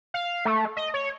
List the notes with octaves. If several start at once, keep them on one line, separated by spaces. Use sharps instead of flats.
F5
A3
D#5
C#5